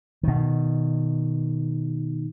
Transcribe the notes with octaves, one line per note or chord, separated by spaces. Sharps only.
B2 D#3